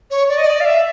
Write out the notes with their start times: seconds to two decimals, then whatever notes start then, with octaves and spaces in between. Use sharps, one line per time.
0.11 C#5
0.29 D5
0.38 D#5
0.46 D5
0.60 F5
0.65 E5